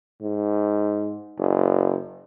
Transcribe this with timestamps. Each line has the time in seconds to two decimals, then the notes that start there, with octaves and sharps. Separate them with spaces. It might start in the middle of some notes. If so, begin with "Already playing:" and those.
0.22 G#2
1.39 F#1